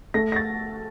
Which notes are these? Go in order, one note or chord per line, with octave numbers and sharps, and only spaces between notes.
A3 A#6
A#6
A6